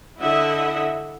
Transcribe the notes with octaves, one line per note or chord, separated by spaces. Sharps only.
D3 E4 D#5 E5 F#5